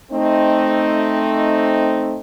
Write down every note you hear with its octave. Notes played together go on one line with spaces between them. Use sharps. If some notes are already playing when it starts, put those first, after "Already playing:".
A3 C4 D#4